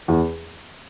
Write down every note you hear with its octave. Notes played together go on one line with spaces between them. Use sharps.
E2